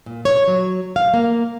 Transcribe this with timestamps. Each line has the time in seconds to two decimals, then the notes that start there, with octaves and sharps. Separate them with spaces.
0.06 A#2
0.25 C#5
0.48 F#3
0.96 F5
1.14 A#3